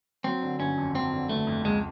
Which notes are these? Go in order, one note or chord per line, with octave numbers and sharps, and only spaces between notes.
F#3 C4
D3
G1 C#4
F2
F#3 C4
D3
G1 A3
F2
C#2 G#3